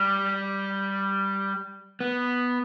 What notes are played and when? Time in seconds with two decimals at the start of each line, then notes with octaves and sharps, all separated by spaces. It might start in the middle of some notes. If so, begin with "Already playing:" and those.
Already playing: G3
2.01 B3